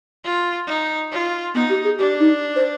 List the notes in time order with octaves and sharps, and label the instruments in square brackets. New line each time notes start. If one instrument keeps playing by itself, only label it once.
[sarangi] F4
D#4
F4
[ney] B3 [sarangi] D#4
[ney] G4
G#4
[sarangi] D4 [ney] G4
[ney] D#4
C5